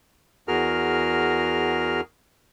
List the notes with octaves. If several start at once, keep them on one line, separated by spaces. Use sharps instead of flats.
E2 F#4 G#4 A#4 F6